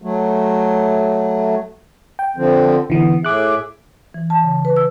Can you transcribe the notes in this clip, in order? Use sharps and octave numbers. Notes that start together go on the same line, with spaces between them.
F#3 A3
G5
D3 F3 C4
D3 E3 B3
A2 G#4 E5 D6 F#6
E3
A5
C#3
B4
E6